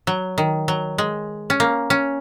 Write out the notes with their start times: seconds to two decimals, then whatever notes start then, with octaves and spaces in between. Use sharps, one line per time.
0.07 F#3
0.38 D#3
0.68 F#3
0.98 G#3
1.50 C#4
1.60 A#3
1.90 C#4